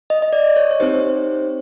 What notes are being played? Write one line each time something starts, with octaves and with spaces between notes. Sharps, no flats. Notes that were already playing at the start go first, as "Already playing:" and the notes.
D#5
D#5
D5
C#5
C#5
C4 D#4 G4 C5